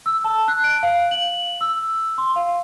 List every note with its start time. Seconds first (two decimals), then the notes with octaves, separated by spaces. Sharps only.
0.06 E6
0.24 A5
0.48 F#6
0.64 D7
0.83 F5
1.11 F#7
1.61 E6
2.18 C6
2.36 F5